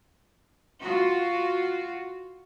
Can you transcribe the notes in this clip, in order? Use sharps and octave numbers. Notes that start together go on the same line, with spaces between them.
F4 F#4